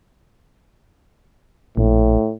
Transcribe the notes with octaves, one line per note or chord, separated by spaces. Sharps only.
A#1 A2